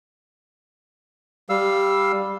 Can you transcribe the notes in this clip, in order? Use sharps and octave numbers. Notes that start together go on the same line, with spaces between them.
G3 F5 E6